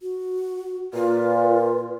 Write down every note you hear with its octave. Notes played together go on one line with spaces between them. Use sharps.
F#4
A#2 F4 B4